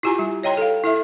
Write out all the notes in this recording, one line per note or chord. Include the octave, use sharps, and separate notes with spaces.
E4 F4 G4 G#5 A#5
G3
C#5 D#5 G5 A#5 C6
A4 F5
E4 A4 E5